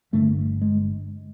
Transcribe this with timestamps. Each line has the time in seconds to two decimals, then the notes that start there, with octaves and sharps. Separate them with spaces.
0.12 G1 G2 D3 A3
0.62 G#3